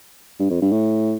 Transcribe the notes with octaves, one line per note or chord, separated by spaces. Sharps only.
G2
F2
G2
A2